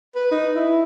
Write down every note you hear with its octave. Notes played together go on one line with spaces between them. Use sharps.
B4
D#4
E4